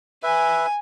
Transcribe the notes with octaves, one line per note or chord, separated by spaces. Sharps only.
B4 E5 G#5